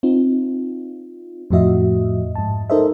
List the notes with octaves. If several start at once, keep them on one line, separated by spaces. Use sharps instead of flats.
C4 D#4 F4
F2 A2 F3 F#4 D#5 E5
G#2 A5
D#4 A4 A#4 C5 D#5 E5